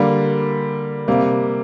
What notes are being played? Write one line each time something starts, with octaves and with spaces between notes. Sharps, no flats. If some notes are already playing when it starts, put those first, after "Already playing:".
Already playing: D3 G3 A#3
C3 G3 A#3